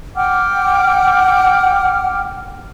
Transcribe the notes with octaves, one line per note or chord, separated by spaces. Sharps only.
F#5 G5 D6 F6